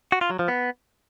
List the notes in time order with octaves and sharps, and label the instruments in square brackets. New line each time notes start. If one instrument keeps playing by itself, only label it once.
[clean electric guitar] F#4
F4
F#3
F3
B3